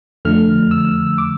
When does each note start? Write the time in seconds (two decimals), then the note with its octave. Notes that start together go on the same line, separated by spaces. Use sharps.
0.25 F2 D3 F3 A3 F6
0.71 E6
1.18 D6